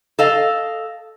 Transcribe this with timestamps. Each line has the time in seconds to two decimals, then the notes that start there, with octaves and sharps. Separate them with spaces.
0.19 A4 D#5 F5